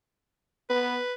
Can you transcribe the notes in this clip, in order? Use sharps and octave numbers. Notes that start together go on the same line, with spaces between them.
B3 B4